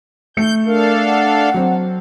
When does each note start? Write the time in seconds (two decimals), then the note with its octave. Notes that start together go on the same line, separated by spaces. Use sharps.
0.37 A3 G6 C#7
0.66 D4 A4 A#4 F5
1.06 F#5
1.54 F#3 C4